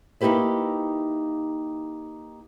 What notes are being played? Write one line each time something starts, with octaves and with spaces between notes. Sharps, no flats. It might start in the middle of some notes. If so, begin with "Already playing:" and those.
A#3 D#4 E4 G4 B4 E5